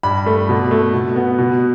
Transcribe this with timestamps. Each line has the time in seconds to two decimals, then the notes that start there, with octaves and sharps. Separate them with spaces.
0.03 G2 B5
0.26 A3
0.49 B2
0.71 A3
0.94 B2
1.16 B3
1.39 B2